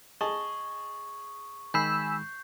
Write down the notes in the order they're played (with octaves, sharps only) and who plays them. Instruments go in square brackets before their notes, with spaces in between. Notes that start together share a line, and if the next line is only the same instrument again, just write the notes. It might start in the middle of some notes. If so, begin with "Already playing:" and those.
[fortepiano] G#4 D#5 A5 [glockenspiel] C#6
[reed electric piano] D#3 G#3 [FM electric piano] G#5 B5 E6 [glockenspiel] G6 C7